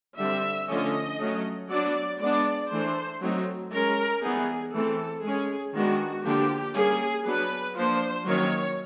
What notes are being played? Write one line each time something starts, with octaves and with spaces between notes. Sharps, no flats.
D3 G3 C4 E5
D3 F3 A3 C#4 D#5
F#3 A3 C#4
F#3 B3 D4 D5
G#3 B3 D4 D5
E3 A3 D4 C5
F#3 A3 C4 D#4
G#3 C#4 A#4
E3 G3 B3 D#4 G#4
E3 A3 C4 A4
G#3 C#4 G#4
D#3 G#3 B3 D4 F#4
D3 F3 A#3 D4 G4
G3 A#3 C#4 G#4
F#3 B3 D4 B4
F3 A#3 D4 C5
D#3 F#3 A#3 C#4 C#5